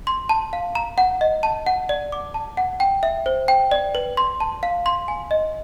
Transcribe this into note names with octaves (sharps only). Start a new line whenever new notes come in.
C6
A5
F5
A#5
F#5
D#5
A5
F#5
D5
D6
A5
F#5
G5
E5
C5
G5
D5
B4
C6
A5
F5
C6
G#5
D#5